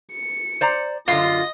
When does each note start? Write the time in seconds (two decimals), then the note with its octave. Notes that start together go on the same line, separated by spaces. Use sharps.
0.13 C#7
0.61 C5 D5 A#5
1.08 F#2 D3 F4 D#5 A#6